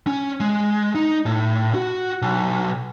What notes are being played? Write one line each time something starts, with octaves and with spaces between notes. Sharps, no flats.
C#4
G#3
D#4
A2
F#4
B1